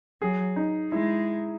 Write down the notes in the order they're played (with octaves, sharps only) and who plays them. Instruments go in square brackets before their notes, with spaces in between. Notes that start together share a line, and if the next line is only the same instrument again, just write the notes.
[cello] F#3 [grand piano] G#4
[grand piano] D#4
[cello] G#3 [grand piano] E4